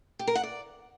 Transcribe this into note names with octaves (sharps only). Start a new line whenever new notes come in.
G4
A#4
F#5
D5